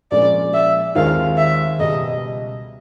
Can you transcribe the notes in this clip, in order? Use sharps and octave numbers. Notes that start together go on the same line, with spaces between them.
A#2 F3 G#3 C#4 F4 D5
E5
D#2 D#3 G#3 C4 F4 F5
E5
C#2 B2 G3 D#5